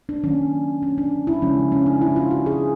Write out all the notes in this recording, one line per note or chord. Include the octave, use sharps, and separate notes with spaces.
D4
D#3 F#3 A#3 C#4
C#4
D4
E4
C#3 F3 G#3 C#4
C#4
D4
E4
F4
F#4
G#4